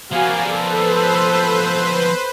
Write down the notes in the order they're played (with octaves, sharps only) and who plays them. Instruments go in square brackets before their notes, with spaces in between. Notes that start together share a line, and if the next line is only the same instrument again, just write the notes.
[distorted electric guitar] F3 B3 [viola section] F#4 F5 G#5 [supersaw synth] A#4 D5
[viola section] A4 [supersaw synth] B4 C5